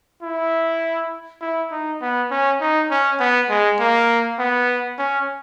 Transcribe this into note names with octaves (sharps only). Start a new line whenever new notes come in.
E4
E4
D#4
B3
C#4
D#4
C#4
B3
G#3
A#3
B3
C#4